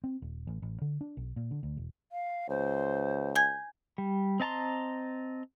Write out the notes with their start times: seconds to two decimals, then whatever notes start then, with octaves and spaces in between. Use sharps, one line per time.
0.04 C4
0.22 D#1
0.47 A1
0.62 A1
0.81 D3
1.01 D4
1.17 B1
1.36 A#2
1.51 D3
1.63 D2
1.77 E1
2.12 F5
2.50 C#2 C5
3.35 G#5 G6 G#6
3.98 G3
4.40 C4 D#5 A5 A#5 C6